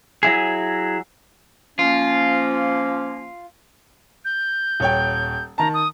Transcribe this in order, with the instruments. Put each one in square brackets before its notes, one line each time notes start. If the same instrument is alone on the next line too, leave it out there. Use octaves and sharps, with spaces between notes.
[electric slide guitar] F#3 E4 G#4
[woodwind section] F3 A#3 C#4 [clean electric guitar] F4
[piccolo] G6
[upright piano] D#1 C#5 G5
[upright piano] D#3 A5 [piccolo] A#5
[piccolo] D#6